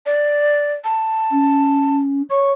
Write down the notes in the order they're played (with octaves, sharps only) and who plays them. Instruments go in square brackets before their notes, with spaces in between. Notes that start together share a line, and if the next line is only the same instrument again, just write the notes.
[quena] D5
A5
[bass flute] C#4
[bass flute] C#5 [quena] C#6